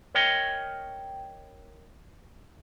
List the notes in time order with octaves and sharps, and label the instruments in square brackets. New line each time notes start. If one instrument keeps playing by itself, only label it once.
[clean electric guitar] A#4 C#5 D#5 G5